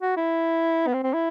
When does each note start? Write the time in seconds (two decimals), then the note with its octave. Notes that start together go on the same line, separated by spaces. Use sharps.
0.01 F#4
0.16 E4
0.87 B3
0.93 C4
1.03 C4
1.13 E4